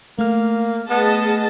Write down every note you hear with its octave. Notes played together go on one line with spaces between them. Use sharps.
A3 A#3 F6
B3 G#4 D#5 A5